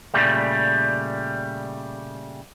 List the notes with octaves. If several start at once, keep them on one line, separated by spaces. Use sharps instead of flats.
A#2 C#3 G3 A3